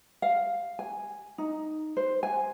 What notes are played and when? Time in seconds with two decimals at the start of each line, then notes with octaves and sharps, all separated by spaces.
0.22 F5
0.79 G#5
1.38 D#4
1.97 C5
2.23 G#5